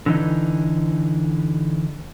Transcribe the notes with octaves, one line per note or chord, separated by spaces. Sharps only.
D3 E3 D#4